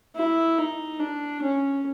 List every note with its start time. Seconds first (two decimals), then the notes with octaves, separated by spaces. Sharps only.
0.16 E4
0.58 D#4
1.00 D4
1.42 C#4